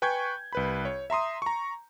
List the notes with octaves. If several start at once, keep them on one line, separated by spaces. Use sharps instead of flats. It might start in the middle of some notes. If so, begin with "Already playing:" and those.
B4 G5 G#5 C#6 G6 G#6
C2 B4 B5
C#5
E5 A#5 C6 D#6
A#5 C#6